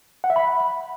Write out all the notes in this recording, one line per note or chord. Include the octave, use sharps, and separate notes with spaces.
F#5
E5
B5